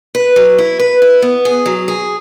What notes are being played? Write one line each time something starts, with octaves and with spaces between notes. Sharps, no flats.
B4
F#3
E4
B4
E4
B3
G#4
F#3
G#4